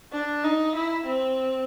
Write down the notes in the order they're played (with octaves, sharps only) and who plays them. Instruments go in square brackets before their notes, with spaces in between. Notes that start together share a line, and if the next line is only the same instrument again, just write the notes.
[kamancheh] D4
D#4
E4
C4